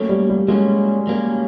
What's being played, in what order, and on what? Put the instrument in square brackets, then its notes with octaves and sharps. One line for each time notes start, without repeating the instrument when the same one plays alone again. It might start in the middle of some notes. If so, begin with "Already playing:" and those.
Already playing: [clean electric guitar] F#3 A#3 C#4 [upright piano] A3
[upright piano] G3
G3
[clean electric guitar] F#3 A#3 C#4 [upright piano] G#3
[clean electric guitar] F#3 A#3 C#4